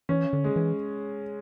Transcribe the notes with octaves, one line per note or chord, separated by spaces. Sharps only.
E3 C#4
D3
G#3
E3